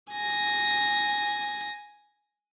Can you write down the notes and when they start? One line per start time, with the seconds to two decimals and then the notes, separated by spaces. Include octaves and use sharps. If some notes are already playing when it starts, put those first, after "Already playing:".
0.11 G#5 A#6